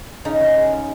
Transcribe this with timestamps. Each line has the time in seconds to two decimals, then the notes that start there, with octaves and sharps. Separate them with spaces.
0.25 C#3 D#4
0.40 C#4
0.56 G#3
0.72 C#3